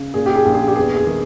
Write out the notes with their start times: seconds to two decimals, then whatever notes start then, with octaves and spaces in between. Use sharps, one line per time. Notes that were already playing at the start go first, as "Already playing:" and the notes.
Already playing: C#3
0.14 A#2 G#4
0.26 G4
0.35 G#4
0.46 A#1
0.55 G#4
0.68 G4
0.76 E2 G#4
0.96 G#4
1.07 D#3